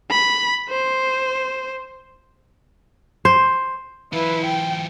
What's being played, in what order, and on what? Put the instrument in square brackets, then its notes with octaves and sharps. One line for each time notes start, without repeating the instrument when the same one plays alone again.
[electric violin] B5
C5
[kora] C5
[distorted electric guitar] E3 F4 [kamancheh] E4 B4
[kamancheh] G5